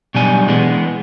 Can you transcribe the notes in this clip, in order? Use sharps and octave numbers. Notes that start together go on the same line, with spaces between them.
B2 F#3 G3 D4 G#5
E3 G#3 B3